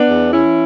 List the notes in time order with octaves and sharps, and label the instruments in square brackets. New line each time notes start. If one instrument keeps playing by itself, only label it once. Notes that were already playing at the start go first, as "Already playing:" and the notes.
Already playing: [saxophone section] B3 D4
E2
E3 C#4 E4